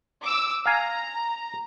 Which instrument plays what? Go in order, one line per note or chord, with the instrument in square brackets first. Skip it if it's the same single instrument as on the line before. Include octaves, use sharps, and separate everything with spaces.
[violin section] D6 E6
[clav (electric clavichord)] F5 G#5 [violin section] A#5